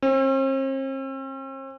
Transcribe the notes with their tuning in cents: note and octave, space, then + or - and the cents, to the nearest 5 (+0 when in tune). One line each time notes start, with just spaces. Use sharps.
C4 +45